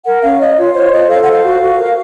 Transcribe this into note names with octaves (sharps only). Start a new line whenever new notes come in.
A#4 F#5
C#4 F5
C#5 D#5
F4 C#5
C5 C#5
F4 D#5
A4 F5
F#5
C5 F5
F#4
F#4
A#4